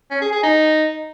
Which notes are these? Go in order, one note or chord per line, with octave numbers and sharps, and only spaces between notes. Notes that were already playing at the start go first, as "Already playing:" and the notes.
C#4
G#4
G#4
D#4